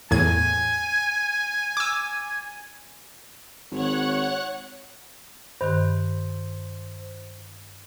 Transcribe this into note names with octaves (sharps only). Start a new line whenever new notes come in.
E2 A2 G#5 G#6
D6 E6
G#1 C#5 F#5 F#6
G2 D#3 C5 F#6